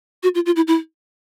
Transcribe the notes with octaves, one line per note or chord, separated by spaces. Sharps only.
F#4
F4
F4
E4
E4